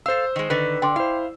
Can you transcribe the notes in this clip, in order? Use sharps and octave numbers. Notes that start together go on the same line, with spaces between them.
A4 C5 F5 E6
D#3 G#3
D3 D#3 B4
D3 G5 C6 D6
E4 C5 F5